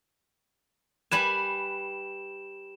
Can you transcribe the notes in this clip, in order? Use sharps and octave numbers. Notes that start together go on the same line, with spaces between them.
G3 B4 G#5 E7